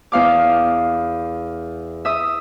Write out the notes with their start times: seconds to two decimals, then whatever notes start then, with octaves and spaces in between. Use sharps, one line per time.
0.12 E2 F5 D6
2.05 E5 D#6